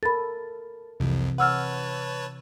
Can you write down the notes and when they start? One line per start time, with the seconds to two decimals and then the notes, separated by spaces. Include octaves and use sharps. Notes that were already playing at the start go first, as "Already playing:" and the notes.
0.03 A4 A#4 B5 A6
1.00 C2 F2 C3 E3
1.38 B4 C#5 F#5 A5 E6 F6